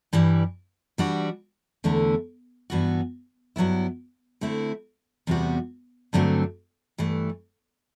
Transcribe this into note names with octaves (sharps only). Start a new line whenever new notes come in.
G2 E3 G3
E3 G3 D4 F#4
E2 D3 A3 E4
G2 E3 B3 F#4
G2 F#3 B3 E4
D3 A3 C4 E4
E2 C3 G3 B3 F#4
G2 D3 F#3 A3 C4
G2 E3 A3